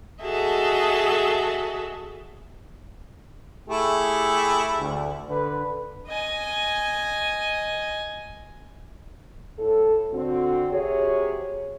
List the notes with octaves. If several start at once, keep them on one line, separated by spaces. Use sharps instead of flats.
F#4 G#4 A4 D#5 E5 A5
A3 E4 G4 G#4
D2
D3 B4
D#5 G#5
A2 A4
D3 C4 F#4
C3 F#4 G#4 C#5